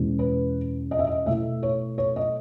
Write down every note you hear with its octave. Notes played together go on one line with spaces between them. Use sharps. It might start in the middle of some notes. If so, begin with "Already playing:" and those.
Already playing: E2 B2 G#3 C#4 E4
B4
D#5
E5
D#5
B2 A3 E4 E5
C#5
C#5
D#5